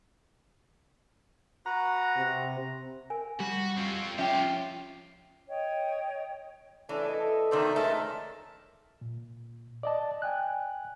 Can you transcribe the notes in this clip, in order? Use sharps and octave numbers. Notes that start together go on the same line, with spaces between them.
F#4 B4 F#5 A#5
C3
A#4 G#5
G3 F#4
C4 F4
F3 C#4 F4 G4 E5 G5 A#5
C#5 D#5 G5
E3 A3 C#4 D4
A4 D#5
G2 B2 D#3 C5 D5 E5
C#2 G#3 A3 A#4 E5 A5
A#2
D5 D#5 A5
G5 G#5 F#6